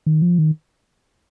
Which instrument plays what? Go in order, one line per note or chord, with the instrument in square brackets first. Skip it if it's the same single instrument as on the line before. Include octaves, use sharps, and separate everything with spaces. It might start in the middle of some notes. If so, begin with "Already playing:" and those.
[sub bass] D#3
F3
D#3